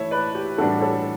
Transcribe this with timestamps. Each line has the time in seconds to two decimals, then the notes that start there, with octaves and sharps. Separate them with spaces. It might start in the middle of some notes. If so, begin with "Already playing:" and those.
Already playing: E3 A3 E4 C#5 E5
0.11 B4 D5
0.34 G4
0.58 A2 E3 G3 D4 F#4 A4
0.81 A4 C#5